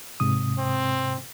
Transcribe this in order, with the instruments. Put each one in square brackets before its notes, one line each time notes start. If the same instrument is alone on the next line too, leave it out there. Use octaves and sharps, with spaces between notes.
[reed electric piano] G#2 C3 D#6
[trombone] C4